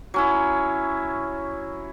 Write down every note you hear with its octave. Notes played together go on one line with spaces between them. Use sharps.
F#3 C#4 E4